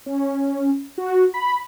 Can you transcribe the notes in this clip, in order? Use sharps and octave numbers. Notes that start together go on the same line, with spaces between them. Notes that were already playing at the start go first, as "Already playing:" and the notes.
C#4
F#4
B5